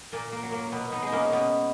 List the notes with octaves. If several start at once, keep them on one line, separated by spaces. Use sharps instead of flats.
A#2 A#3
A#3
F#3
A#3
B2 B3
B3 D#4
G#3 D#4
A#3 C#4
B2 B3